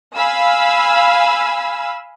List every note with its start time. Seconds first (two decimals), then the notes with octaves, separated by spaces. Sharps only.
0.16 F5 G#5 B5 E6